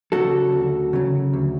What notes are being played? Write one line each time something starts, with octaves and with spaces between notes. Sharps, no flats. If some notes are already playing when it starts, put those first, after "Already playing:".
C#3 F#3 F#4 A4
D2
C#3 F#3
D2